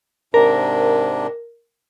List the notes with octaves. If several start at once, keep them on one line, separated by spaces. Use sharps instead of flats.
G#2 C3 D4 A#4